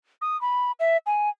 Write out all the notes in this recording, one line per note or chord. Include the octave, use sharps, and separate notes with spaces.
D#6
B5
E5
G#5